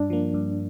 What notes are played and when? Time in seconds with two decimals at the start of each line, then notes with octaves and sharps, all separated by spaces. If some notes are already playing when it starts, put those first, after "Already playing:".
Already playing: G2 D4
0.10 F3 A#3
0.34 G2